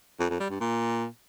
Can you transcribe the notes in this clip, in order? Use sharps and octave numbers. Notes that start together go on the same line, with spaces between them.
F2
F2
G3
G2
A#2